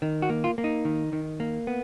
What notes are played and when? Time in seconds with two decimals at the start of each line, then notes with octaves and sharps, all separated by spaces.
0.02 D#3
0.22 F#4
0.30 A#3
0.44 F4
0.58 A#3
0.64 D#4
0.85 D#3
1.13 D#3
1.40 A#3
1.67 B3